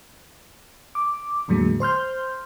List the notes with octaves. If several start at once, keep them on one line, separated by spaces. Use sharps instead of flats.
D6
E2 A2 D3 F#3 G#3 A#3
C5 C6 F6 G6